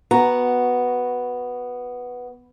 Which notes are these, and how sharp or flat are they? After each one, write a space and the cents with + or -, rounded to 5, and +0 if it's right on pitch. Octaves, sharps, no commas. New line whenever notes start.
B3 +0 F#4 +0 A#5 +0